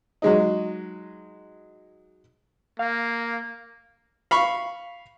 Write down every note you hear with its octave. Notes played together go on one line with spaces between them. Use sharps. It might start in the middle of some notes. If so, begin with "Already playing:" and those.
F#3 G#3 D#4
A#3 F5
F5 B5 C#6